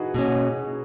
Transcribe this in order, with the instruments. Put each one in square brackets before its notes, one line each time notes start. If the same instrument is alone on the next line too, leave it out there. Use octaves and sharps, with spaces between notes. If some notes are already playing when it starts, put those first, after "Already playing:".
Already playing: [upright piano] D#4 E4 F#4 G#4 B4
[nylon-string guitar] B2 A#3 C#4